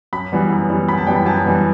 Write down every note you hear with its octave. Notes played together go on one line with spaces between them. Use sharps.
F#2 B5
E3 G3 B3
F#2
E3 G3 B3
F#2 B5
A5
E3 G3 B3 G5
B5
F#2 A5
E3 G3 B3